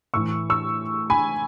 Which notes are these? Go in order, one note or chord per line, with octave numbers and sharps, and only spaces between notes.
A2 E3 C#6 E6
C#6 E6
G#5 B5